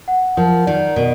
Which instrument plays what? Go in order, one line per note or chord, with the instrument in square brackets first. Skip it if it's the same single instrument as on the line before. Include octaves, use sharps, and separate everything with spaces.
[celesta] F#5
[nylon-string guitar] F3 [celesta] A#4
[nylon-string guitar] D#3 [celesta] D5
[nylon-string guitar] B2 [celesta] A#4